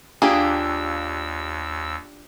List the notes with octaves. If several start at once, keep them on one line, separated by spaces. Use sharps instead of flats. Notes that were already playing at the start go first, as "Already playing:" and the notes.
D#2 A#3 D4 F4 G4 G#4 E6